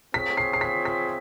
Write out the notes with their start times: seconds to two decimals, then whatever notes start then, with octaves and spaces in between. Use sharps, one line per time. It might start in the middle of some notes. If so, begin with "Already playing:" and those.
0.14 C4 F4 G#4 C#5 B6
0.37 C7
0.53 C7
0.61 B6
0.85 B6